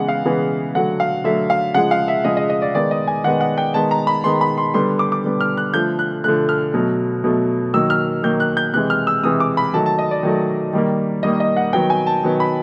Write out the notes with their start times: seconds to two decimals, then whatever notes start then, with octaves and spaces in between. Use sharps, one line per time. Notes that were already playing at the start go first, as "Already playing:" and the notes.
Already playing: C#3 E3 G#3 B3 F#5
0.08 F5
0.25 C#3 E3 G#3 B3
0.75 D3 F#3 A3 F#5
1.00 F5
1.24 D3 F#3 A3 E5
1.50 F5
1.74 C#3 F3 G#3 F#5
1.91 F5
2.08 E5
2.25 C#3 F3 G#3 D#5
2.37 D#5
2.50 D#5
2.62 D5
2.75 D#3 G#3 B3 D5
2.91 D#5
3.08 G#5
3.24 D#3 G#3 B3 F#5
3.41 F#5
3.58 G5
3.74 D#3 G#3 B3 A5
3.91 A#5
4.07 B5
4.24 D#3 G#3 B3 C6
4.41 B5
4.58 C6
4.74 D3 G3 B3 C6
4.99 D6
5.12 D6
5.24 D3 G3 B3
5.41 F6
5.57 F#6
5.74 D3 F3 A3 G6
5.99 F#6
6.24 D3 F3 A3 F#6
6.49 F6
6.74 B2 F#3 A3
7.24 B2 F#3 A3
7.74 D#3 F#3 A#3 E6
7.90 F6
8.23 D#3 F#3 A#3 G6
8.40 F#6
8.57 G6
8.74 C3 E3 G#3 F#6
8.90 F6
9.07 E6
9.23 C3 E3 G#3 D#6
9.40 D6
9.57 B5
9.73 D#3 F#3 A3 A5
9.86 A5
9.99 D#5
10.11 D5
10.23 D#3 F#3 A3
10.73 D#3 G3 A#3
11.23 D#3 G3 A#3 D#5
11.40 D#5
11.56 F#5
11.73 D#3 F#3 B3 G5
11.90 G#5
12.07 A5
12.23 D#3 F#3 B3
12.40 B5